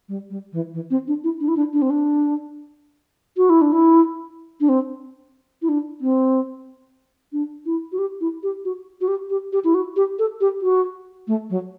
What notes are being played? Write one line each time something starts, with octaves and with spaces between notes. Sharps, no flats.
G3
G3
E3
E3
C4
D4
E4
D4
E4
D4
D4
C4
D4
F#4
E4
D4
E4
D4
C4
E4
D4
C4
D4
E4
F#4
G4
E4
G4
F#4
F#4
G4
G4
G4
E4
F#4
G4
A4
G4
F#4
A3
F#3